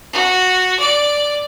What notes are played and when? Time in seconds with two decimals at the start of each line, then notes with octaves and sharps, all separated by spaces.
0.13 F#4
0.79 D5